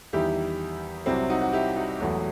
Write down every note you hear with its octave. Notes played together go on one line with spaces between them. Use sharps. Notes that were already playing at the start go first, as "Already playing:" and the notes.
E2 D#3 G3 E4 G4
C2 C3 F#3 C4 E4
D#4 F#4
F#4
E4 G4
D#4 F#4
E1 E2 B2 F#3 A3